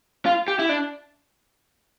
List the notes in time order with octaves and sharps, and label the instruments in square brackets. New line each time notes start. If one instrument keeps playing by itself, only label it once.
[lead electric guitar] F4
G4
E4
D4